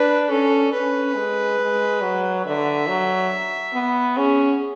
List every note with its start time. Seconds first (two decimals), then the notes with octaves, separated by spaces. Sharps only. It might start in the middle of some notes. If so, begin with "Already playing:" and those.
Already playing: D4 B4
0.30 C#4 A4
0.72 C#4 B4
1.15 G#3
1.59 G#3
2.02 F#3
2.45 D3 E5
2.88 F#3
3.73 B3
4.16 C#4 G#4